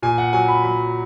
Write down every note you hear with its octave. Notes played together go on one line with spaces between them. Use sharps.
A#2 G#5
F#5
F#3 G#5
B5
F#3 B5